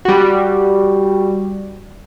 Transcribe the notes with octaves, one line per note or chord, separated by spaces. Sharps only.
G3 F#4